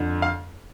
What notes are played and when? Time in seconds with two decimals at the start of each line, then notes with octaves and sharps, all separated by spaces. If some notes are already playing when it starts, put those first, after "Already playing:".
Already playing: F2 D3
0.22 F5